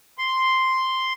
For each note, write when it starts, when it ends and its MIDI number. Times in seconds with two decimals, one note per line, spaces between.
0.18 1.13 84